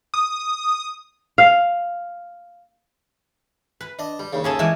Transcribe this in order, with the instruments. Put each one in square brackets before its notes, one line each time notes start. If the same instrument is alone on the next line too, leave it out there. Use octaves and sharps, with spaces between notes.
[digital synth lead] D#6
[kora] F5
[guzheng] B4
[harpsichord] D4 D#5
G3
D#2 C#3
[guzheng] C#4 G#4 A4
E3 G3 G#3